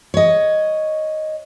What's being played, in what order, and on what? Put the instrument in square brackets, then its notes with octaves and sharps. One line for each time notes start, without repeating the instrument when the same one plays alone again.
[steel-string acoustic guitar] C#5 D#5